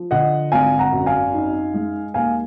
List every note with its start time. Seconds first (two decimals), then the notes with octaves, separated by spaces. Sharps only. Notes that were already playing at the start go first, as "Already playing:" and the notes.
Already playing: F3
0.11 D3 D#5 F#5
0.52 G#1 F5 G#5
0.79 F#5 A#5
0.92 F#2
1.06 F5 G#5
1.33 D#4
1.74 G#3
2.14 D#2 F5 G#5